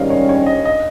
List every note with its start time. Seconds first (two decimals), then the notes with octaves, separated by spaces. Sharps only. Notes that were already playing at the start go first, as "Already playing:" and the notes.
Already playing: G#2 D#3 G3 C#4 D#5 F5
0.10 C#5
0.29 C#5
0.46 D#5
0.65 D#5